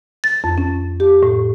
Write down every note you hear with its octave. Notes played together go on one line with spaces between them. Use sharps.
A6
F2
C#4
G4
A2